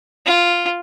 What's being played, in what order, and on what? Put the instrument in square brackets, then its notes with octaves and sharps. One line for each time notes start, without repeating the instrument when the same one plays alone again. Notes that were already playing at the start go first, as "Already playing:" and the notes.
[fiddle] F4